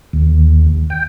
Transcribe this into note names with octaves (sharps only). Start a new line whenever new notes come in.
D#2
G5